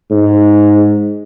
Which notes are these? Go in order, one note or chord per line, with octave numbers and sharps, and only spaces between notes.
G#2